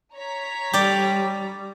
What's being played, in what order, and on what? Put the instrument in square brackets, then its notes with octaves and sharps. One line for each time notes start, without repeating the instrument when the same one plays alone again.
[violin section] C#5 A#5 B6
[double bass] G3 [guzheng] G4 D5